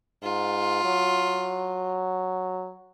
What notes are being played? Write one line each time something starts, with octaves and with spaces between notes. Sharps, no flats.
G#2 F4
F#3